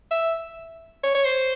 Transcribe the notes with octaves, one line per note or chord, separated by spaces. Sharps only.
E5
C#5
C#5
C5